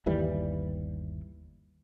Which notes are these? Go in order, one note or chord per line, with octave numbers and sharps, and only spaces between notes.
G1 D#2 E3 G3